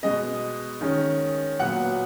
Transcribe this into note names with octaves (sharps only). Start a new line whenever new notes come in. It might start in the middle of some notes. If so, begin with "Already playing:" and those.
B2 G#3 B3 D#5
D#3 G#3 C#4
A#2 F#3 B3 F#5